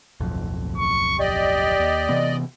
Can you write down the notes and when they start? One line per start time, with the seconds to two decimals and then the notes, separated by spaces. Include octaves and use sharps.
0.20 D1 B1 F2
0.78 C#6
1.20 G4 D5 D#5
1.80 D#2
2.09 C3 E3 B3